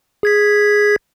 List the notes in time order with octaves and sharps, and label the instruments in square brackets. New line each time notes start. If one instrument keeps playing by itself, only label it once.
[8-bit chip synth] G#4 G#6 B6